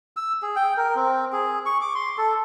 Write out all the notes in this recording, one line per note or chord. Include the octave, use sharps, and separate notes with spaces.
E6
G#4
G5
A#4
C4
G#4
C#6
D6
C6
A4